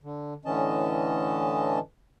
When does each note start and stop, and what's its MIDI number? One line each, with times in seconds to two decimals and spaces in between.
0.04 0.34 50
0.45 1.79 45
0.45 1.79 50
0.45 1.79 52
0.45 1.79 61
0.45 1.79 75
0.45 1.79 81